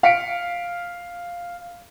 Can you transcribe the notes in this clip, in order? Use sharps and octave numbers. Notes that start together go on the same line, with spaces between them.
F5 B6 C#7 D7